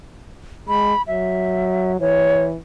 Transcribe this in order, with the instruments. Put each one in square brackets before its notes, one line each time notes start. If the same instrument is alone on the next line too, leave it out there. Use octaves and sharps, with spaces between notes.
[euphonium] G#3 [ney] B5
[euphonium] F#3 [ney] E5
[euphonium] E3 [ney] C#5